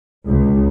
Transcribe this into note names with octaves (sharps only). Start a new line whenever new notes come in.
C#2